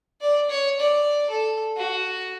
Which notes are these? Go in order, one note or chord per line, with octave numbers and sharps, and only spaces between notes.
D5
C#5
D5
A4
F#4